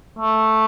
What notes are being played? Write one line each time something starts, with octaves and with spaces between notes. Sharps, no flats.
A3